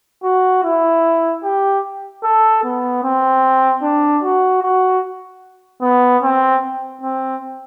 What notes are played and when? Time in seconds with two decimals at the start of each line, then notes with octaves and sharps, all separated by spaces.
0.23 F#4
0.63 E4
1.43 G4
2.23 A4
2.63 B3
3.03 C4
3.82 D4
4.23 F#4
4.63 F#4
5.81 B3
6.22 C4
7.01 C4